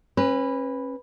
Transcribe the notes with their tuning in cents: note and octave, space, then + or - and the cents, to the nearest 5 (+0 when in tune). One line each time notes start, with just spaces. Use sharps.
C#4 -35 B4 +0